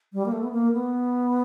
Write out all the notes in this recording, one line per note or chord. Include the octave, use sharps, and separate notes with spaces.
G3
A#3
A3
B3
A#3
B3